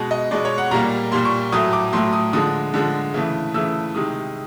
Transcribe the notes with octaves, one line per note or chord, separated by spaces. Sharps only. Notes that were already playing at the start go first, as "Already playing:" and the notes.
Already playing: B2 G#3
D#5
B2 G#3 D5
C#5
F#5
A#2 G3 A#3 A#5
A#2 G3 A#3 C6
C#6
A2 F#3 A3 D#6
D6
A2 F#3 A3 C6
D#6
D3 F3 G#3 D#6
D3 F3 G#3
C#3 E3 A3
C#3 E3 A3 E6
C3 D#3 G#3 D#6